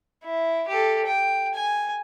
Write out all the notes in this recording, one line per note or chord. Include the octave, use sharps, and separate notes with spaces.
E4
G4 A4
G5
G#5